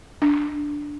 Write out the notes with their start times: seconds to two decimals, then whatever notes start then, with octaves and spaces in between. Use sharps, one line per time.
0.22 D4